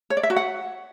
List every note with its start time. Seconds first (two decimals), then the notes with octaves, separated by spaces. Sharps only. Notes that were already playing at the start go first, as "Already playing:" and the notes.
0.10 C#5
0.17 D5
0.23 E5
0.30 F#4
0.36 F#5